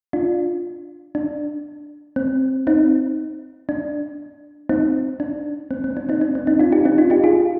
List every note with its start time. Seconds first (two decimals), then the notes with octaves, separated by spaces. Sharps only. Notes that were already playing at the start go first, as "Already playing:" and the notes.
0.13 D4 F4
1.15 D4
2.16 C4
2.67 C4 D#4
3.69 D4
4.69 C4 D#4
5.20 D4
5.71 C4
5.84 C4
5.97 D4
6.09 C4 D#4
6.21 D4
6.35 C4
6.47 C4 D#4
6.59 D4 F4
6.72 D#4 G4
6.85 C4 D#4
6.98 D4 F4
7.10 D#4 G4
7.24 F4 G#4